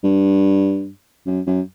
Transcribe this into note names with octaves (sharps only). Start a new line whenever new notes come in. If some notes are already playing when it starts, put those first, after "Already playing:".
G2
F#2
F#2